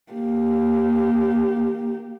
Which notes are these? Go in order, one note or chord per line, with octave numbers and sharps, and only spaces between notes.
A#3 G4